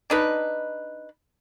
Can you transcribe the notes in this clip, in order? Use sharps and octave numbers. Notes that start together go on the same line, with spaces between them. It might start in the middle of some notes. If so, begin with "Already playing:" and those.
D4 D#4 B4